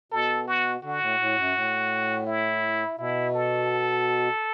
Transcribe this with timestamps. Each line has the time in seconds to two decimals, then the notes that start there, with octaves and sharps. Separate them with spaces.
0.12 B2 A4
0.48 F#4
0.83 D3 F#4
1.02 A2
1.20 A2
1.37 F#2
1.55 A2
2.27 E4
2.99 B2 E4
3.34 A4